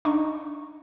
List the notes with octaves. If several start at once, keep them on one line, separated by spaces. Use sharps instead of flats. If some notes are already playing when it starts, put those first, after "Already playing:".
D4 D#4 D#5 A#5 C#6